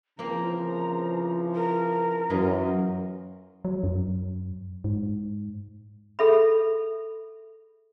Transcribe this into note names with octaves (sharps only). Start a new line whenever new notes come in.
C#3 E3 F3 A#3 C4 A#5
A#4
F#2 E3 F4 D#5
F#3
F#2
G#2
G#4 A4 E5 B5